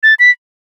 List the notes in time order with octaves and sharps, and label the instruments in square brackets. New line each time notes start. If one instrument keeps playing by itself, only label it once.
[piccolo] A6
B6